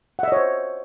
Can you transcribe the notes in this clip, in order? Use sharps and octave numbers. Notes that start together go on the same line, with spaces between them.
C5 C#5 D#5 E5 F#5